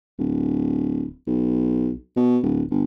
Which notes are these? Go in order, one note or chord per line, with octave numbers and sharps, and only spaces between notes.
D1
B1
B2
D1
G1